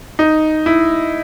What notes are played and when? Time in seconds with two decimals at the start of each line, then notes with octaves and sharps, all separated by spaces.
0.19 D#4
0.66 E4